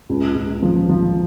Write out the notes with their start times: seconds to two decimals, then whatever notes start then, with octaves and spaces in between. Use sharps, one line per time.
0.09 C#2
0.35 C#2
0.63 F3
0.89 F3